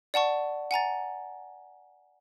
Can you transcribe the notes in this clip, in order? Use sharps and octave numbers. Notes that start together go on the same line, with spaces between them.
D5 F#5 A5 C#6
F#5 G#5 A#5 A6